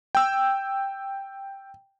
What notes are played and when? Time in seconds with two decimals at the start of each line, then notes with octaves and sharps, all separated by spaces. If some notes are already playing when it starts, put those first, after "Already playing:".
0.15 G5 E6